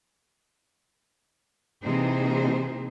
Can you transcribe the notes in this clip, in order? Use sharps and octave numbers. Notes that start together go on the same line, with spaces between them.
C3 E3 A#3 D#4 G#4 C5